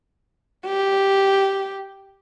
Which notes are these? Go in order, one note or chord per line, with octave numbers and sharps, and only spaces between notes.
G4